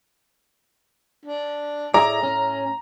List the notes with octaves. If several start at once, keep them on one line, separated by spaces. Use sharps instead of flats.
D4
A2 E4 G#4 D5 A#5
C#4